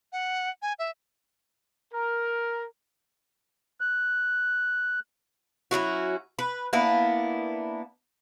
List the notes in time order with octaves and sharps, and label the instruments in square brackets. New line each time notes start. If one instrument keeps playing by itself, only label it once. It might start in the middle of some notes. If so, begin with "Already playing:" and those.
[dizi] F#5
G#5
E5
[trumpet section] A#4
[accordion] F#6
[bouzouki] F#3 C#4 E4 F#4
B4
A#3 B3 D4 E4